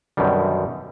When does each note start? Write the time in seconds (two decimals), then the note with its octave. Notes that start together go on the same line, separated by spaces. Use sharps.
0.17 F#2 B2 D3 D#3 G3